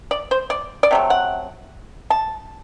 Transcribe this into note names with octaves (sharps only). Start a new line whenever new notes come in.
D5
C5
D5
D5
C3 F#3 A3
F#5
A5